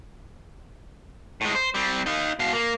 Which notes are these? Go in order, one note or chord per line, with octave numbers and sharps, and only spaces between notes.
A2 G#3
C5
G3 C4
D#4 F5
B2 F5
A#3